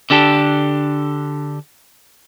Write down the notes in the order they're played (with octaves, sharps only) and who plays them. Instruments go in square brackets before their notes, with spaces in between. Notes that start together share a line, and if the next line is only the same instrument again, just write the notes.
[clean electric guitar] D3 D4 G4 A4